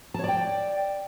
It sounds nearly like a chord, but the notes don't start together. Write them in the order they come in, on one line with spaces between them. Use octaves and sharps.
A5 C#5 D5 G5